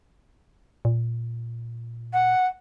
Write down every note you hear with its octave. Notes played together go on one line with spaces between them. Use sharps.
A#2
F#5